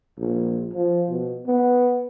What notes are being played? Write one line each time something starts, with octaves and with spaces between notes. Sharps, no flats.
A#1
F3
B2
B3